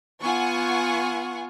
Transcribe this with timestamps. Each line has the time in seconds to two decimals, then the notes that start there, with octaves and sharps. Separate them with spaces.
0.21 B3 F4 F#5 G#5 C#6